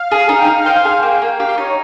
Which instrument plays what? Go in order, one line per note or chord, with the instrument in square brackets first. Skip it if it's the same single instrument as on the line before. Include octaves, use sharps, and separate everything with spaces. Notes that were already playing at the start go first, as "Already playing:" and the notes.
Already playing: [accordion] F5
[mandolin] G#4
D#4
[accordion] G5
[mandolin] D#4 [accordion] F5
[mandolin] C5 [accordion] G5
[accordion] F5
[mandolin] G#4
[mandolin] A#3 [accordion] G5
[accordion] F5
[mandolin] A#3 [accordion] G5
[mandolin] G4 [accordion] F5
[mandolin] D#4 [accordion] C#5